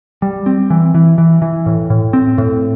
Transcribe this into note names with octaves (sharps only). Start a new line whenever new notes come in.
G3
C4
E3
E3
E3
E3
A2
A2
C4
A2